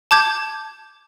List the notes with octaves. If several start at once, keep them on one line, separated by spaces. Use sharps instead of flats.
A5 D6 G6 G#6